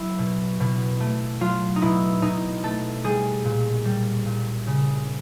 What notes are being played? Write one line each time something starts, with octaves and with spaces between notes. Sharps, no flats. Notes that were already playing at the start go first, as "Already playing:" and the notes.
Already playing: F#3 E4
B2
B2
A3
F#3 F4
D#4
B2 E4
B2 D#4
A3 A4
G3 G#4
A#2
G3
A#2
C#3